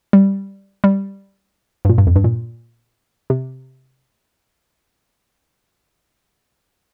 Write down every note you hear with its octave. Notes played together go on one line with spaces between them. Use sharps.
G3
G3
G2
A#2
G2
F2
G2
A#2
C3